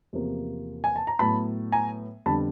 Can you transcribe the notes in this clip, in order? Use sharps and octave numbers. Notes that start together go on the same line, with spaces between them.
E2 C3 F3 A#3
G#5
A5
A#5
A2 F#3 B3 A5 B5
G#5 A#5
F2 D3 G3 B3 A5 B5